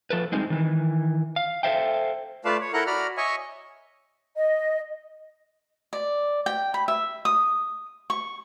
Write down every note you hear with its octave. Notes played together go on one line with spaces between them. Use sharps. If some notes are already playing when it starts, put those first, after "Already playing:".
F3 A4 B4
G3 G#3 C4 D#4
D#3 E3
F5
A4 A#4 C5 E5 F5 G5
A3 F4 B4 D5 F5 A5
C#5
E4 A4 A#4 F#5 A#5 F#6
F#4 D5 A#5 B5 F6
C#5 D#5 E5 G#5 C#6
D#5
D5
G5
B5
E5
D#6
C#6